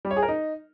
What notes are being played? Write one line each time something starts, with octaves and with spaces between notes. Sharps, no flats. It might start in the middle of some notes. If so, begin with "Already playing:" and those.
G3
C#5
G#4
A#4
D#4